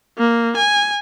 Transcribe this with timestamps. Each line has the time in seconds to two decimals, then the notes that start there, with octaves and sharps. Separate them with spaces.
0.18 A#3
0.57 G#5